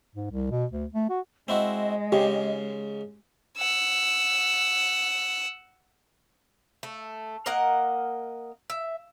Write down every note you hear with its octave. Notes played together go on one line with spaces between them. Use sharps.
G#2
C2
B2
D2
A3
F#4
G#3 C4 E4 F#4 D#5
G#2 C#3 G4
F#5 E6
A3
A#3 A#4 D#5 F#5
E5